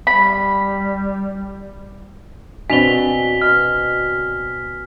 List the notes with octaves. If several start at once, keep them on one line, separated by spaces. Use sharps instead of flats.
G3 B5
B2 C4 D4 F#4 G#5 B6 F7 G7
B2 F6